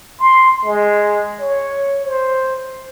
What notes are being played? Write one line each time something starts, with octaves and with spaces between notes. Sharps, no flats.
C6
G#3
C#5
C5